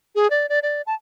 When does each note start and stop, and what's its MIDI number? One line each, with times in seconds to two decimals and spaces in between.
0.15 0.30 68
0.30 0.49 74
0.49 0.59 74
0.63 0.82 74
0.87 0.94 81